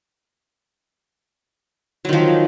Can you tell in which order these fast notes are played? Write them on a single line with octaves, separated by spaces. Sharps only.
F#3 D#3 F3